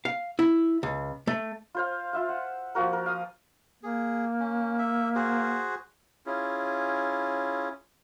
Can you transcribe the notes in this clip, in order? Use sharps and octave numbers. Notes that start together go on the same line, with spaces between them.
F5
E4
C#2
A3
F4 C5 F5
F4 E5 F5
F#5
F3 A#3 F#4 A#4
A#4
F5 D#6
A#3 G#4
C#4
E5
F#4 G#4 C5
C#4 E4 F4 G#4